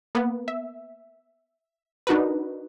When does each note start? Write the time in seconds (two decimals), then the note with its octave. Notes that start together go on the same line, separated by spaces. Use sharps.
0.15 A#3 B3
0.48 E5
2.07 D4 D#4 F#4 A#4 B4